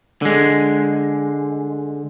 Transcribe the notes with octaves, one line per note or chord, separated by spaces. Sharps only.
D3 G#3